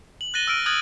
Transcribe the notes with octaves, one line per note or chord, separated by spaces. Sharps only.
F#7
F#6 A6 A#6 D#7 G7
E6 F6 D7 D#7
D#6 F6 F#6 G#6 A6 F#7